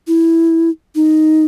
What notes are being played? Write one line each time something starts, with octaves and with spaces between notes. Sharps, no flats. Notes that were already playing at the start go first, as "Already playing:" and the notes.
E4
D#4